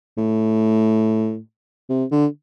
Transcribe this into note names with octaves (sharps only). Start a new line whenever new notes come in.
A2
C3
D3